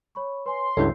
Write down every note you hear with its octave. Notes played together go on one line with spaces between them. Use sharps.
C#5 B5 C#6
B4 C#5 G#5 C6
C#2 G2 C#4 E4 A4 E6 G6 C7